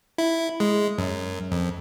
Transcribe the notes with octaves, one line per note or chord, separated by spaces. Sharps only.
E4
G#3
F#2
F2